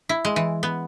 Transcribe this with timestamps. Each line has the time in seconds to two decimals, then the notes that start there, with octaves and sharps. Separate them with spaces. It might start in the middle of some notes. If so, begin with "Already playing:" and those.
0.09 E4
0.25 G#3
0.36 E3
0.63 B3